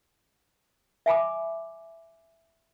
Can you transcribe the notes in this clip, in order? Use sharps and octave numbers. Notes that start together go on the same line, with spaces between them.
E5 G#5 B5 D6